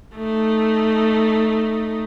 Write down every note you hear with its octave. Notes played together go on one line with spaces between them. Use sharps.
A3 D#4